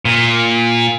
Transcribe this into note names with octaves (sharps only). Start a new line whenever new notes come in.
A#2